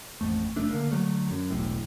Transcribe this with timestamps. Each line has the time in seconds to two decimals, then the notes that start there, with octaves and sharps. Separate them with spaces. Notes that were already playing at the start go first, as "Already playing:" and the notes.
0.21 A1 F2 A3
0.56 F#1 A3 D4
0.71 D3 A#3
0.91 D3 F#3 A3
1.31 F#2
1.50 E1 B1 A2